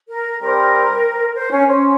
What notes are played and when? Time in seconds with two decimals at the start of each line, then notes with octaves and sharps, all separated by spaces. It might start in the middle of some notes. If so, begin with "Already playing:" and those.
0.09 A#4
0.40 G3 C4 G4 A#4 C5
1.35 C5
1.51 C#4
1.66 C#4 C5